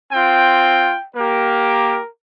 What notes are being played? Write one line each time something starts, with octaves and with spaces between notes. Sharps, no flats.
C4 F4 G5
A#3 G4 A#4